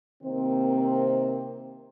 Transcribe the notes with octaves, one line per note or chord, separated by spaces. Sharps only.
C3 D#3 A#3 C4